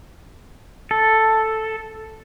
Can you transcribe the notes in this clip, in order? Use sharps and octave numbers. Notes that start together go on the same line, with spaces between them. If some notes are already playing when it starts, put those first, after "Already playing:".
A4